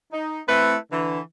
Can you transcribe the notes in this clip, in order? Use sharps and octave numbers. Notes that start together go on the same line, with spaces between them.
D#4
A3 C4 E4 B4
D3 E3